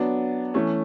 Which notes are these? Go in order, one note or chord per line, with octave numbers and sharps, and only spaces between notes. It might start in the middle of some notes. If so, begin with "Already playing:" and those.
Already playing: F#3 B3 D4
E3 A3 C#4